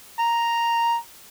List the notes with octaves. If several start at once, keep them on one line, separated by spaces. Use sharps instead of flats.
A#5